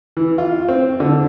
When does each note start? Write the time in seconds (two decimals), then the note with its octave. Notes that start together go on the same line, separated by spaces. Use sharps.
0.17 E3
0.38 F4
0.69 C4
1.00 D3